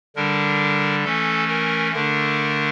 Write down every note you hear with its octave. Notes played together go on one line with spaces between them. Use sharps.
D3 G3 D4 A#4
E3 A3 C#4 A4
A#4
D3 A3 D4 A#4